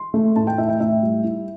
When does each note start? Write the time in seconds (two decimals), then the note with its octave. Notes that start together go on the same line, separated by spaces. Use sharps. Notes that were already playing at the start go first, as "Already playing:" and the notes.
Already playing: C6
0.14 A3
0.36 A2 A5
0.47 G5
0.58 E4 E5
0.69 G5
0.80 A2 E5
1.03 G3
1.24 E4